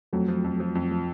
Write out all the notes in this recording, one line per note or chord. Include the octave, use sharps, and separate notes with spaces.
F2 F#3 A3
F3
F2
F3
F2
F3